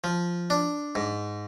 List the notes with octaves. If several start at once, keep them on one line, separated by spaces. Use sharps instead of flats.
F3
D4
G#2